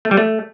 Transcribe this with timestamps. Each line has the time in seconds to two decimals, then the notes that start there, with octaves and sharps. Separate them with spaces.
0.05 A3
0.11 G3
0.17 A3